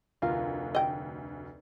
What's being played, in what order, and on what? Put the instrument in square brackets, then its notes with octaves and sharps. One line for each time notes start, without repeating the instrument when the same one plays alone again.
[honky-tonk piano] F1 D2 [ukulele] F4 A#4 F5
[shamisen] D#5 G5